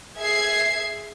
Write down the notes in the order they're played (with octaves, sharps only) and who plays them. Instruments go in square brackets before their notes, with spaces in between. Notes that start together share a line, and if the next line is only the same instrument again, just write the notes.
[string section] G#4 E5 G#6 C7